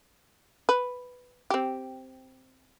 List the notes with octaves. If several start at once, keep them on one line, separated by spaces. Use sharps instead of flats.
B4
C4 G4